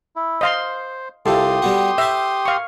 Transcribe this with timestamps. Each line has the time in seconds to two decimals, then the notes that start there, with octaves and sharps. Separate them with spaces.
0.16 E4
0.41 C5 D#5 F5 C6
1.26 C2 C3 F4 G4 A4 C6 D#6
1.62 G3 B3 F#4
1.98 C5 E5 A5
2.45 F5 C#6